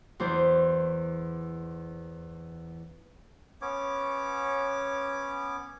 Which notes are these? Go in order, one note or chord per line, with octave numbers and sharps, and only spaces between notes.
E2 E3 C5
B3 C#4 C#5 D6